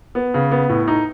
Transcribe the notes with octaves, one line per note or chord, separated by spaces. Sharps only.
B3
C#3
B3
A2
D#4